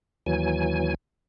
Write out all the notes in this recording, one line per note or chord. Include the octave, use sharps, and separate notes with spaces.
D#2 E3 F#3 G#5